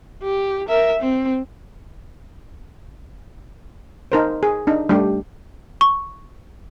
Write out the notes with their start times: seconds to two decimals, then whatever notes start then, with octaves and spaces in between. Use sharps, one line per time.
0.23 G4
0.69 A#4 E5
1.00 C4
4.12 D#4 A#4 C5
4.43 G#4
4.67 D4 D#4
4.89 G3 A3 D4 G4
5.81 C#6